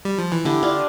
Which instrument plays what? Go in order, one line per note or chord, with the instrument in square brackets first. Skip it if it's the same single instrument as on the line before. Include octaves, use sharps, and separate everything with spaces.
[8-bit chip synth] G3
F3
E3
[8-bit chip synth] D3 [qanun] E4 G4
[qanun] D4 F4